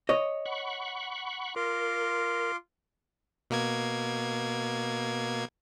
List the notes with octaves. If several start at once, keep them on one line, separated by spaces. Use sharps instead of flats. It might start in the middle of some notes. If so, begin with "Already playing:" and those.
C#5 D#5
F#5 B5 C#6
F4 A#4 C6 D6
B2 A#3 G#6